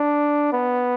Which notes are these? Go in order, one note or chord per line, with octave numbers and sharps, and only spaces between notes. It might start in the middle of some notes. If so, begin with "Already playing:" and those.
Already playing: D4
B3